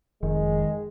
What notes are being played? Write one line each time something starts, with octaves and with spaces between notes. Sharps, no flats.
F1 D#3 G#3